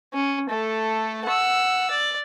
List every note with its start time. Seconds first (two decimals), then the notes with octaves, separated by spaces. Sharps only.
0.13 C#4
0.49 A3 A4
1.25 F#5 E6
1.91 D5